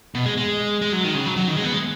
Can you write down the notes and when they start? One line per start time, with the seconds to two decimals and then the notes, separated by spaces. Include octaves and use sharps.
0.15 B2
0.26 G#3
0.37 G#3
0.82 G#3
0.93 F#3
1.04 D#3
1.15 C#3
1.26 F#3
1.36 F#3
1.48 D#3
1.56 G#3
1.64 B3
1.73 G#3